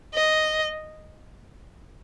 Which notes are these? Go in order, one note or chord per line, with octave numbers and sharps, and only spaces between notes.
D#5